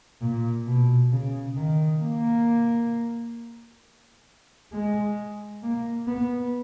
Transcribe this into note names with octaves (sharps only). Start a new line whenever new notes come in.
A#2
B2
C#3
D#3
A#3
G#3
A#3
B3